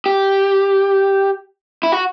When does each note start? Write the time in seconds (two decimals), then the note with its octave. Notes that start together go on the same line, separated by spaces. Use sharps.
0.06 G4
1.83 E4
1.92 F#4